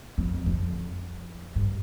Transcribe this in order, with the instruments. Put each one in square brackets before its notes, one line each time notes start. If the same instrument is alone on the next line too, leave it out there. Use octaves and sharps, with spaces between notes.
[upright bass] F2
F2
G2